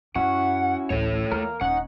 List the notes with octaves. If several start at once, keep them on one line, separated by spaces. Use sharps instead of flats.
F#2 C#4 E4 F#4 F#5
A1 D2 A3 C#5
E2 A#3 A#4
D#1 C#4 D#4 F#5